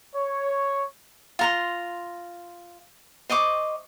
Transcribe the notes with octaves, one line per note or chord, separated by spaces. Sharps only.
C#5
F4 A#5 C6
C5 D#5 C#6 D6